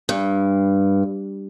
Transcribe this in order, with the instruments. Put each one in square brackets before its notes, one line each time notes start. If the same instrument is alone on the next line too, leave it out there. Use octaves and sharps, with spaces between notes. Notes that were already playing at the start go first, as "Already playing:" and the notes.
[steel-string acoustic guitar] G2